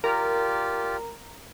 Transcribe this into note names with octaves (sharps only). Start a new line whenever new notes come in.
F4 G4 A#4 D5